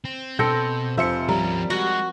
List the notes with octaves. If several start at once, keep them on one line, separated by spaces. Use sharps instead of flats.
C4
B2 C4 A4 G6 A#6 C#7
F1 F3 C5 E5 C#7
F3 G3 C#4 A#4
G#3 F#4